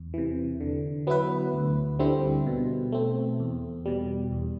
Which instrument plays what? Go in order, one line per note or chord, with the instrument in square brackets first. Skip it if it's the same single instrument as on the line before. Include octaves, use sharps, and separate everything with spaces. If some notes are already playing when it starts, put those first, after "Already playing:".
Already playing: [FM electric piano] E2
C3 E3
D3
F#3 B3 E4 B4
D2
D3 G3 C4 E4
B2
A3 C4
E2
B2 G3
E2